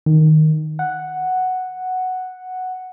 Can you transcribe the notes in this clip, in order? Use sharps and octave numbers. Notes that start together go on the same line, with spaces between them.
D#3
F#5